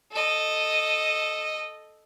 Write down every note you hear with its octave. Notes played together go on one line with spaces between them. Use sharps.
A4 D#5